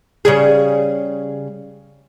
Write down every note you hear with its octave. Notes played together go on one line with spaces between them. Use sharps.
C#3 G3 G#4